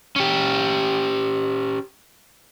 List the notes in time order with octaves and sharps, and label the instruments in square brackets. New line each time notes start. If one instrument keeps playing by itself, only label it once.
[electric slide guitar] C#4 G4